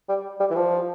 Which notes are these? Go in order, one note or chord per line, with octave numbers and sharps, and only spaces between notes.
G3
G3
E3
F3